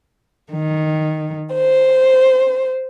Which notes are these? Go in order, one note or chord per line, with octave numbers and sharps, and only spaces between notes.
D#3
C5